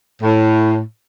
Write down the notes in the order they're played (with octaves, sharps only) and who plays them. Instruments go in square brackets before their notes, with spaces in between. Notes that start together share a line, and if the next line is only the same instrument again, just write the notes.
[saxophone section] A2